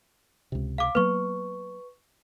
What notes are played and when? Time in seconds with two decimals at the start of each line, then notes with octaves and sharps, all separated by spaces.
0.52 C#2 C3
0.78 F5 D6
0.95 F#3 A#3 B3 B4 C#6